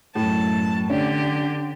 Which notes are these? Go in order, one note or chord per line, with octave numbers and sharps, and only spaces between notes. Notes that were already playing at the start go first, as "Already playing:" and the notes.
F#2 A2 A5
D3 C#4 D4 G4